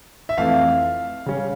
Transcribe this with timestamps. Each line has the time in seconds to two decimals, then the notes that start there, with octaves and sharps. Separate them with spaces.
0.29 E5
0.37 F2 E3 A3 F5
1.26 C#3 G3 C#4